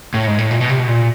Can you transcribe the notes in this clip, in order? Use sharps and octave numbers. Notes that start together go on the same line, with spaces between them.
A2
G#2
A2
A#2
B2
C3
B2
A#2